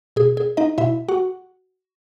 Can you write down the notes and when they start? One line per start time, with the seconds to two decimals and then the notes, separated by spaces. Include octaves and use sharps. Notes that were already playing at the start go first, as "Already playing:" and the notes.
0.16 B2 G#4
0.37 G#4
0.57 D#4 D#5
0.78 B2 E4 E5
1.09 F#4 F#5